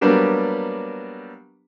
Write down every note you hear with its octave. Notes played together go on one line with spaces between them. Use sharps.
F#3 G3 A#3 B3 D4 G4